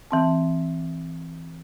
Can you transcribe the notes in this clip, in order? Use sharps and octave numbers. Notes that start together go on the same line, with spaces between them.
E3 C4 A5